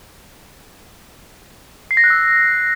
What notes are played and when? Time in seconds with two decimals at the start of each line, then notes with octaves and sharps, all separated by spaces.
1.91 C7
1.97 A#6
2.04 F#6
2.10 E6